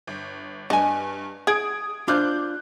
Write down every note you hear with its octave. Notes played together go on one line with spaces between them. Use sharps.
G1
G2 D4 D#5 G#5
G#4 D#6 G#6 D7
D4 F4 C5 D6 F#6 G6